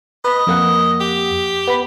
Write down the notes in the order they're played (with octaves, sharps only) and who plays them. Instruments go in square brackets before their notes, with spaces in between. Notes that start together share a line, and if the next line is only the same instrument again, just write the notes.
[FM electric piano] B4 B5 [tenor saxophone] D#5
[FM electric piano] F2 A#3 F#5
[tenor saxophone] G4
[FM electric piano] B3 B5